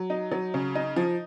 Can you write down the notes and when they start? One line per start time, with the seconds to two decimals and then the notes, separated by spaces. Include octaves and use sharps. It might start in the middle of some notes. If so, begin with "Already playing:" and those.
Already playing: F#3
0.10 D#4
0.32 F#3
0.54 C#3
0.75 D#4
0.96 F3